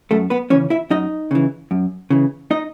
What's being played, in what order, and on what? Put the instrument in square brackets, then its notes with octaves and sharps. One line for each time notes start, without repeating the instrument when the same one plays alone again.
[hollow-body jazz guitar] F#2 A3 A4
B3 B4
C#3 E3 C#4 C#5
E4 E5
F#2 D#4 D#5
C#3 E3
F#2
C#3 E3
D#4 D#5